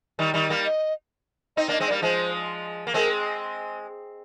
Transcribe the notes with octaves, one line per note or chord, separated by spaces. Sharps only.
D#3 G3
D#3 G3
G3 A#3
D#5
C4 D#4 D#5
A#3 D4 D#5
G#3 C4
D5
G3 A#3
F3 G#3 C5
A#3
G#3 C4 A#4